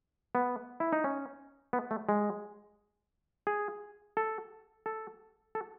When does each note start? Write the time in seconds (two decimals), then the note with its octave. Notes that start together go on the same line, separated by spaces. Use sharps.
0.35 B3
0.80 E4
0.93 D#4
1.04 C#4
1.73 B3
1.91 A3
2.09 G#3
3.47 G#4
4.17 A4
4.86 A4
5.55 A4